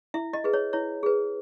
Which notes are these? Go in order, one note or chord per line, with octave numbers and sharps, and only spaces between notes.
E4 E5
D#5
G#4 B4
C#5
E4 C#5
G#4 B4